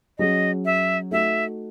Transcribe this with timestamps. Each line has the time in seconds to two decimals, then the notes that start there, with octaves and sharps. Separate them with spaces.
0.18 F#3 C#4 G#4 D#5
0.65 E5
1.11 A3 D#4 F#4 E5